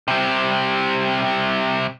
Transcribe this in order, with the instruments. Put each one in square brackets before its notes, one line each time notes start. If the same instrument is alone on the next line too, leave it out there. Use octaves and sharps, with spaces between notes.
[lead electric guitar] C3 G3